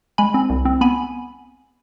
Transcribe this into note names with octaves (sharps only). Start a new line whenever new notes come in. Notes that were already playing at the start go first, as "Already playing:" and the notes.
G#3 G#5 B5
C4
C2
C4
B3 G#5 B5